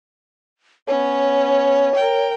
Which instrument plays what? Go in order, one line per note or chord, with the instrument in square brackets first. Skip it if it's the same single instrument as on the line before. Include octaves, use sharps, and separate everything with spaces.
[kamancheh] B3 C#4 [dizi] C#5
[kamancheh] A#4 G5